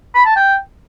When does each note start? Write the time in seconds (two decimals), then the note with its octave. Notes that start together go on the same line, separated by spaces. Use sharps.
0.15 B5
0.26 A5
0.36 G5